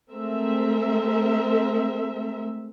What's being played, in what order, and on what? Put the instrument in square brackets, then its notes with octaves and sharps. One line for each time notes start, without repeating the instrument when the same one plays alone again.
[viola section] G#3 A3 C4 A#4 E5